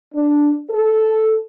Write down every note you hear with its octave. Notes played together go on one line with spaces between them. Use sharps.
D4
A4